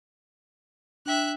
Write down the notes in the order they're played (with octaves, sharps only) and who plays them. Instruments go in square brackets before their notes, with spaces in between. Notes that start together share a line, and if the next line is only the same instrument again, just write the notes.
[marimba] D4 G5 [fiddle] E5 F#6